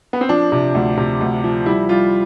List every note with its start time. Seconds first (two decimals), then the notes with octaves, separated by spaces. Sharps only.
0.13 B3
0.21 C4
0.29 F3 D4
0.52 C3
0.75 D2
0.97 C3
1.21 D2
1.44 F3
1.66 G3 E4
1.89 G3 F4